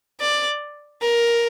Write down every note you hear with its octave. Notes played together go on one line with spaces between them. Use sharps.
D5
A#4